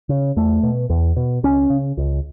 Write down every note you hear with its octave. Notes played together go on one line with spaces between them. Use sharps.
C#3
E2 A3
B2
E2
B2
C#2 C#4
C#3
C#2